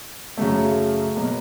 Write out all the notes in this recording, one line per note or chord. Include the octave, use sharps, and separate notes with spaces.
F#2 C#3 F#3 A3
B2 F#3 A#3